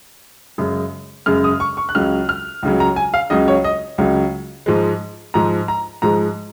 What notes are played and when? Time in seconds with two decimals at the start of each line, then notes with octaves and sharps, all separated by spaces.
0.58 F#2 C#3 G#3
1.26 F#2 C#3 G#3 F6
1.44 D#6
1.60 C#6
1.77 C#6
1.89 F#6
1.95 C#2 C#3 F#3 F6
2.29 F6
2.63 C#2 C#3 F#3
2.80 A#5
2.96 G#5
3.14 F5
3.30 C#2 C#3 F#3 D#5
3.48 C#5
3.64 D#5
3.98 C#2 C#3 F#3
4.66 G#2 F3 G#3
5.34 G#2 F3 G#3 A#5
5.68 A#5
6.02 G#2 F3 G#3 A#5